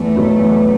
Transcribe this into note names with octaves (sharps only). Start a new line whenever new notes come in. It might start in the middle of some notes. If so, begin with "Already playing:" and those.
Already playing: E2 A3
B2 F#3 B3
E2